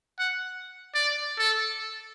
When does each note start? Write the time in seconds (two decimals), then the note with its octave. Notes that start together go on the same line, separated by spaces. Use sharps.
0.19 F#5
0.95 D5
1.39 A4